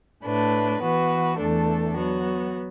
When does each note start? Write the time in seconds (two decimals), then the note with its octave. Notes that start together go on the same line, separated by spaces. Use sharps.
0.24 A2 A3 D4 B4
0.82 E3 B3 F#4 B4
1.39 E2 E3 A3 D4 A4
1.97 F#3 B3 F#4